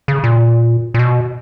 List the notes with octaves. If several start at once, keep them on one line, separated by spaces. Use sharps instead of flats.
C#3
A#2
A#2
B2